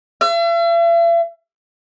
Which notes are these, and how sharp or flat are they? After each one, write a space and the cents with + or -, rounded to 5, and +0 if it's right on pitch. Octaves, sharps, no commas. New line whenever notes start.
E5 +45